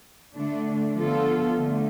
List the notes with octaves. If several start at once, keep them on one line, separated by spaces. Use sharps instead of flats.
D3 A3 D4
D3 F3 B3 F4 A4
D3 A3